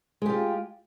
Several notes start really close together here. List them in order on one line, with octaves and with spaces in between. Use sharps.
G#3 G4 F4